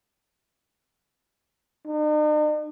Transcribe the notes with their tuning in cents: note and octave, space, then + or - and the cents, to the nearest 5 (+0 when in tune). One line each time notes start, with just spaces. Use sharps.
D#4 -45